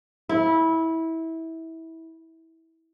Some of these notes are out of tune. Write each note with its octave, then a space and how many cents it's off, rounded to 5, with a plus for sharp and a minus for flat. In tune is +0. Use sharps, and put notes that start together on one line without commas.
E4 -20